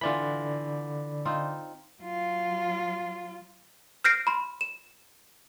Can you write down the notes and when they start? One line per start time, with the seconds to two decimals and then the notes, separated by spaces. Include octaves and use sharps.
0.01 D3 E3 F4 D5 B5
1.25 C4 D#4 F4
2.01 F#3 F4
4.04 F6 G6 A#6 C7 D7
4.27 B5 C6
4.61 E7